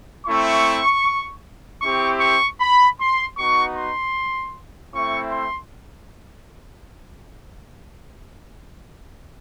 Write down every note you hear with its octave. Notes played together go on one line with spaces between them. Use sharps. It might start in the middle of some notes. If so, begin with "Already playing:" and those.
A3 C4 E4 C#6
C4 E4 G4 C#6
C#6
B5
C6
B3 D#4 F#4 C#6
C6
A3 C4 E4 C#6
C6